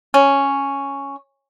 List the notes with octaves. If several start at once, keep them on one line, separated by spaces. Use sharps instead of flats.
C#4